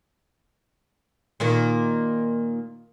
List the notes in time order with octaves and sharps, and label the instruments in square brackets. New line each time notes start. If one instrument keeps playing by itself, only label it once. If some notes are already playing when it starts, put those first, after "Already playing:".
[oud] A#2 D#3 A#3